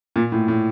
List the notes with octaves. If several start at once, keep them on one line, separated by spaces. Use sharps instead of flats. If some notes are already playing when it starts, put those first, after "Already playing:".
A#2
A2
A2